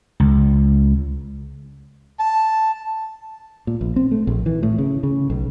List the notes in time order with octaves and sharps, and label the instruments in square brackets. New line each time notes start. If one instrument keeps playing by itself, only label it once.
[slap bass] C#2
[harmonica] A5
[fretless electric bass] A#2
A#1
C4
A3
A#1
E3
A2
C#3
C#3
B1